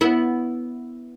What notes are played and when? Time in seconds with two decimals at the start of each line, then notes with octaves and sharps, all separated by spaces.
0.01 B3 E4